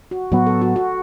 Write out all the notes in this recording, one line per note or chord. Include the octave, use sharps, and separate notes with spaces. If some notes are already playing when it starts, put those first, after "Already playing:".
F#4
A2 F#3 B3 F#4
A4
F#4
F#4